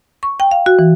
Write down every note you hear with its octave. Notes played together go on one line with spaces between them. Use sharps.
C#6
G5
F5
F#4
E3